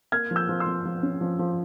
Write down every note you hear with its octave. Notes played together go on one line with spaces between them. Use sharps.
A#3 F6 G#6
F3
E6 G6
F3
C6 E6
F3
F3
C#4
F3
F3